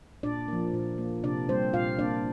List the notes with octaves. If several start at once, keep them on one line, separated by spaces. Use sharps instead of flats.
A#2 D4 D5
F3 A#3
A#2
A#3
C3 D4 D5
G3 A#3 C4 C5
A#2 F4 F5
A#3 D4 D5